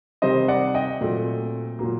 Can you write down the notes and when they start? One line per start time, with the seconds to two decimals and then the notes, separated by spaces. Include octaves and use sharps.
0.22 C3 D#3 G3 C5 D#5
0.48 D5 F#5
0.74 D#5 G5
1.01 A#2 F#3 A3 C4
1.79 A#2 F#3 A#3